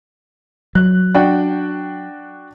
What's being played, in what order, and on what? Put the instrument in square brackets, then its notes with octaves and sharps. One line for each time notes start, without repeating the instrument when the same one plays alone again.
[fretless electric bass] F#3 [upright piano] F#6
[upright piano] D4 F#4 G5